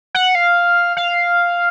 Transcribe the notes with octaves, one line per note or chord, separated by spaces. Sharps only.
F#5
F5
F5